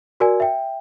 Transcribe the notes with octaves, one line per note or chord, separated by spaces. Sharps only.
F#4 A#4 D5 G#5
E5 G5